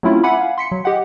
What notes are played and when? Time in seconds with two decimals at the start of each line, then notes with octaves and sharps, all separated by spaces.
0.03 F#3 A3 C4 C#4 E4 F4
0.23 E5 F#5 G#5 B5 D6
0.37 F5 G#5
0.58 C6 B6 C#7
0.72 F#3
0.84 G4 D#5 F#5 G5